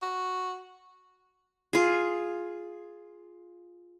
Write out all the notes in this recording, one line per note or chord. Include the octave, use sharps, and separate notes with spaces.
F#4
F4 G#4